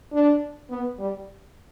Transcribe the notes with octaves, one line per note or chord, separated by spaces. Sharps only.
D4
B3
G3